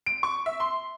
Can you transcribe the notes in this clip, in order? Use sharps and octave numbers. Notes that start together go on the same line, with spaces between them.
D7
C#6
E5
C6